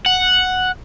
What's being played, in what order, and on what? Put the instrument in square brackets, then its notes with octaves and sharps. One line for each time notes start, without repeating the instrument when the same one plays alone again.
[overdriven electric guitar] F#5